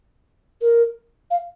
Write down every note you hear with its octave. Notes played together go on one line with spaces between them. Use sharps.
A#4
F5